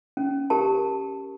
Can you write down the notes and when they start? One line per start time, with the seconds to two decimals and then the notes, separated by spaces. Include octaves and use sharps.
0.17 C#4
0.50 G4 A#4 A5